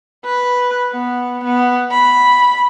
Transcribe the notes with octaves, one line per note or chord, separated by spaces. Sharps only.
B4
B3
B3
B5